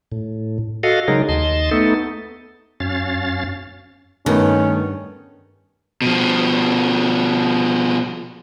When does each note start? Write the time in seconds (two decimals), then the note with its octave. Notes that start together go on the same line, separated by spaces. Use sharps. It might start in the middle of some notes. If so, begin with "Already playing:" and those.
0.12 A2
0.83 F#4 A4 D#5 F5
1.08 C#3 F#3 G#3 D#4 G#4 A#4
1.29 D#2 D#5 A5 C6
1.71 A3 B3 D#4 A4
2.80 F#2 C#4 F5 A6
4.26 G2 D#3 A3 B3 C#4 D#4
6.02 B2 F3